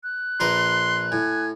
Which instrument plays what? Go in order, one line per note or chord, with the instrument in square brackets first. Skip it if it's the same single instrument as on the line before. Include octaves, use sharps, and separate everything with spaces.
[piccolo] F#6
[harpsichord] A#1 A#4 B4 [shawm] C6
[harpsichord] A2 [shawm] G#5